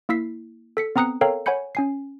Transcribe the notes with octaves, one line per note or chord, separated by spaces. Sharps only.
A#3 E4 E6 B6 C7
A4 B6 C#7
B3 C4 A#5 D#6 F#6 C#7
A4 A#4 C#5 F5 G5 A#5
C#5 F#5 G#5 B5 G6 C#7
C#4 G#5 C7